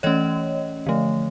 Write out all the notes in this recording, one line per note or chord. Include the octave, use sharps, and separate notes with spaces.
E3 A3 C#4 C#5 D#5
D3 F3 A3